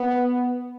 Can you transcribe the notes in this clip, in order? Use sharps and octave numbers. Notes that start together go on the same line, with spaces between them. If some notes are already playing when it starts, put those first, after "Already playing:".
Already playing: B3